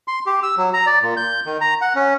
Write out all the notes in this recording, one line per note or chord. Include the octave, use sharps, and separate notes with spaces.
C6
G4
E6
F#3
A#5
D5
A#2
G6
D#3
A#5
F#5
C#4